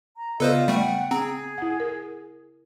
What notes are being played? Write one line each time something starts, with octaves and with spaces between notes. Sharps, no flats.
A#5
C#3 B3 F4 A4 B4 C5 D5 D#5
G3 A3 F#5 G5
C4 G#4 A#5
E4 F#5
A#4